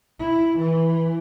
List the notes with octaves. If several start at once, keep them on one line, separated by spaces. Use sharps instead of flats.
E4
E3